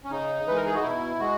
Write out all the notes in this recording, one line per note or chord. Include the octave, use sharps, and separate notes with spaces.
C#4
C#3 D#4
E3 G#3 B4
A#4
G#4
F#4
B2 E4
G#3 F#4